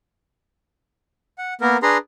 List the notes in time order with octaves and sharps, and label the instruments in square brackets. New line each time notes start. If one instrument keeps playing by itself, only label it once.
[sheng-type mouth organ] F#5
A#3 B3 A#4
D4 G#4 B4 A#5 C6